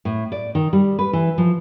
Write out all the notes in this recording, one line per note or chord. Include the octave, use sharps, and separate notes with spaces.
A2
D5
D#3
G3
B4
E3
F3